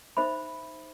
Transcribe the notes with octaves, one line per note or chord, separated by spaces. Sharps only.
D#4 C5 E5 B5